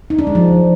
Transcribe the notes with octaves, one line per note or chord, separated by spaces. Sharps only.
D#4
D4
G#3
F3